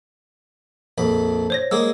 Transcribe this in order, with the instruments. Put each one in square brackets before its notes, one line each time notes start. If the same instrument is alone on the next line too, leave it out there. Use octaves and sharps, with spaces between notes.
[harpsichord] A#1 F2 B5
[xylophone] C5 C#5 A#6
[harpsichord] G#3 A#3 G#4 [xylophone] E6